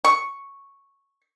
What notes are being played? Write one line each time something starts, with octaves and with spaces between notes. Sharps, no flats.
C#6